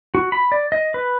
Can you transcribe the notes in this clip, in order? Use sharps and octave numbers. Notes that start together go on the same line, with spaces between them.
F#4
B5
D5
D#5
B4